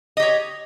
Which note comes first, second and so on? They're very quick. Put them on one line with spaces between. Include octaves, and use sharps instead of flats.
D#5 G4 C#5